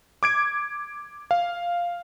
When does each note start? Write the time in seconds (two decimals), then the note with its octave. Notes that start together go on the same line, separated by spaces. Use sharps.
0.23 D6 G#6 D7
1.31 F5